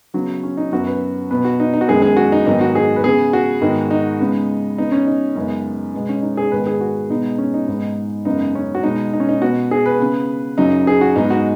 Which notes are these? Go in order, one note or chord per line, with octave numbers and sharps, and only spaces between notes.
C#3 F#3 B3
C#4
D#4
F#2 F#3 B3 F#4
B4
B2 B3 B4
F#4
D#4
D#4
F#4
F#2 D#3 G#3 B3 G#4
G#4
F#4
D#4
G#2 D#3 F#3 B3 D#4
F#4
G#4
B4
C#3 B3 G#4
F#4
G#2 D#3 G#3 B3
D#4
C#3 G#3 B3
C#3 B3 D#4
C#4
D#4
F#2 C#3 G#3 B3
B2 G#3 B3
C#4
D#4
G#4
G#2 D#3 G#3 B3 B4
G#4
F#4
B2 G#3 B3 D#4
C#4
D#4
G#2 G#3 B3
F#2 C#3 G#3 B3 D#4
C#4
F#4
B2 G#3 B3 D#4
D#4
C#4
D#4
B2 B3 F#4
G#4
B4
C#3 B3
F#2 C#3 F#3 D#4
G#4
F#4
G#2 G#3 B3 D#4
F#4